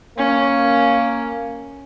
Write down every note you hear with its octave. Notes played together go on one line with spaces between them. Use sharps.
A#3 C#4